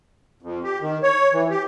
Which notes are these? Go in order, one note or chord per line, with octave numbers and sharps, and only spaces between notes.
F2
G4
D#3
C#5
E3
G4